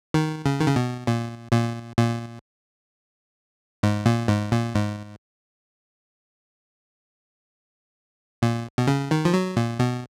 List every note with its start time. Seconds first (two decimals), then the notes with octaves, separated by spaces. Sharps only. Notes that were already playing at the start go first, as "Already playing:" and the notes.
0.14 D#3
0.46 C#3
0.60 D#3
0.68 C#3
0.76 B2
1.07 A#2
1.52 A#2
1.98 A#2
3.83 G#2
4.06 A#2
4.28 G#2
4.52 A#2
4.75 G#2
8.42 A#2
8.78 B2
8.87 C#3
9.11 D#3
9.25 F3
9.34 F#3
9.56 A#2
9.79 B2